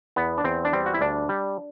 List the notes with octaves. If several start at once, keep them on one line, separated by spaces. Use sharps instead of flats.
E2 B3
D4
E2 C4
D4
G3 C4
F#4
E4
D2 D4
G3